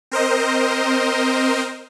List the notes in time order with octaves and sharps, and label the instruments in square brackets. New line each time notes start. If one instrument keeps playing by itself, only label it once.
[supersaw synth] C4 A#4 C5 D#5